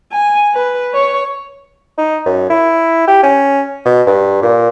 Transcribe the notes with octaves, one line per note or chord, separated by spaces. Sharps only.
G#5
B4
C#5
D#4
F#2
E4
G4
C#4
B2
G2
A#2